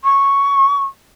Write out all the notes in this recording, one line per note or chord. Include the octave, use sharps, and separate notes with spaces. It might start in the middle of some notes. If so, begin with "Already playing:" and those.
C#6